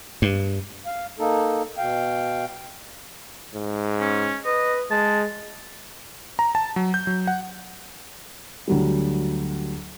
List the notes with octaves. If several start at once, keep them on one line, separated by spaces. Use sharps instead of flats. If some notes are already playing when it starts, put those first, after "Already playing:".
G2
F5
A#3 D#4 A4
B2 F5 G5
G#2
C#4
B4 D#5
G#3 A5
A#5
A5
F#3
G6
F#3
F#5
D2 F#3 G3